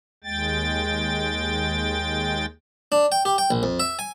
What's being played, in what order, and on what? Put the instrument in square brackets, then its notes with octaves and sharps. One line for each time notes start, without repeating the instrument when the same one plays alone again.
[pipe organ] D#2 G#3 G5 A6
[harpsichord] D4
G5
G4
G5
A#1
F2
E5
G#5